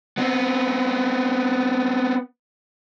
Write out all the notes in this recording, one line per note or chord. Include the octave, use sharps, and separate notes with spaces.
B3 C4